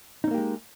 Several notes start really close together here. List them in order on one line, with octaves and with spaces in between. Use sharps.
D#4 C#4 A#3 G4 G#3